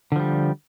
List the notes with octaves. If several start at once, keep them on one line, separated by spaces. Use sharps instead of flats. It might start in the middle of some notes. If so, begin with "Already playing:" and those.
D3 F3 G3